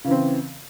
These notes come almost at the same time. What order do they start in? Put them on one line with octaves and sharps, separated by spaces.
C#3 E3 C4